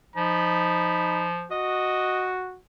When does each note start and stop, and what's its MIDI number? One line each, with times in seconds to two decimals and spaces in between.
0.16 1.46 53
0.16 1.30 63
0.16 1.30 83
1.51 2.57 66
1.51 2.29 75